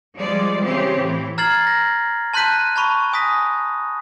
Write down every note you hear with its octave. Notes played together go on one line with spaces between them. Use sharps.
F3 G3 G#3 D5
C#3 E3 C4 G4
A2 E3
A#5 F6 G#6 A6 C7 F#7
A#6
A5 C6 F#6 G6 B6 D#7
A5 B5 C#6 F7
G#5 D#6 A#6 B6